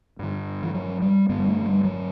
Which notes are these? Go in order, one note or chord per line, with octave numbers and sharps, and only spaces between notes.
G2 D3
E3
F#3
G3
G2 D3 B3
G3
A3
F#3
G3
F#3